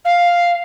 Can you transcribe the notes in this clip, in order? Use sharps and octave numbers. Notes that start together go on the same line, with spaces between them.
F5